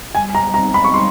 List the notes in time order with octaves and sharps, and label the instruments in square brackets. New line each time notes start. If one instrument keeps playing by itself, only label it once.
[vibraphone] G3 [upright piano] G#5
[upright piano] A#5
[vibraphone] C4 D#4 [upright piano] A#5
[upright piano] B5
C#6
[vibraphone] G3 [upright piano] C6